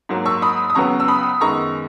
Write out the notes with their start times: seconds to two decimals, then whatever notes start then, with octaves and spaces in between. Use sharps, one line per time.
0.09 G#2 F#3 A#3
0.26 C#6 E6
0.42 B5 D#6
0.70 D#6
0.75 C#2 C#3 F#3 B3 A#5 C#6
1.00 E6
1.08 B5 D#6
1.41 F#2 D#3 G#3 B3 A#5 C#6